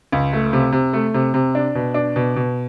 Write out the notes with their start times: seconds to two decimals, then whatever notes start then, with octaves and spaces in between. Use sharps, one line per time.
0.12 C#2
0.33 A3
0.53 C3
0.72 C3
0.93 A3
1.14 C3
1.34 C3
1.55 D4
1.75 B2
1.94 D4
2.16 B2
2.36 B2